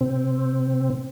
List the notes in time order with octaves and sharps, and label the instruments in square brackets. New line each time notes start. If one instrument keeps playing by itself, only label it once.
[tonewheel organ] C3 C4